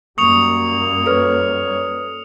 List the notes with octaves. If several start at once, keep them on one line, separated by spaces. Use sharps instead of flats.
F#2 G3 A#3 C#6 D#6 C#7 F7
A4 B4 C#5 F6